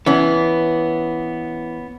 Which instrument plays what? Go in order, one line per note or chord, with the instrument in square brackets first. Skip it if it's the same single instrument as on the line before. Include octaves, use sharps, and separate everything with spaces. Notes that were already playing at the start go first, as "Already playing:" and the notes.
[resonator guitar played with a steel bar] E3 C#4 [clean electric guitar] B3